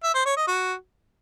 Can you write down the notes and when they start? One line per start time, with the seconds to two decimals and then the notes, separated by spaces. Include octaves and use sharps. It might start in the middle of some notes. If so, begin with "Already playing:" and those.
0.03 E5
0.14 C5
0.25 C#5
0.36 D#5
0.47 F#4